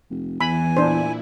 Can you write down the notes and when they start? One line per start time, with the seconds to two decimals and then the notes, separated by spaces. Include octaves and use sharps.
0.10 F1
0.41 E2 E3 G#5 B5
0.77 A#2 D4 E4 C5